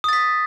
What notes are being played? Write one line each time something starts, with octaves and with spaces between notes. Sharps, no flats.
D#6 A6 B6